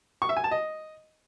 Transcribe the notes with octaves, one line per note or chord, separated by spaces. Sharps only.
C#6
E5
G#5
A5
D#5